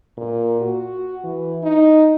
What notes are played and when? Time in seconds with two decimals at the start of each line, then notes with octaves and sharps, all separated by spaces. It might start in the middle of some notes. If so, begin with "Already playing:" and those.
0.18 A#2
0.61 F#4
1.24 E3
1.63 D#4